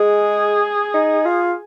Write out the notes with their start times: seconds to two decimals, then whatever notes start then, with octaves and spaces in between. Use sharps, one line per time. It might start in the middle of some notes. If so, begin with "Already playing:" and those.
Already playing: G#3 G#4
0.94 D#4
1.25 F4